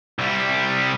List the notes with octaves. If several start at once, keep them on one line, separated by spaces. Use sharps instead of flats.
C2 G3